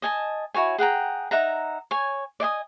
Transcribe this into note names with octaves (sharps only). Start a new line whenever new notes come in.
D#5 G#5 A5
E4 F#4 C#5 G#5
G#4 F#5 G5 A#5
D#4 E5 F#5 A#5
C#5 G#5
D5 D#5 G#5 D#6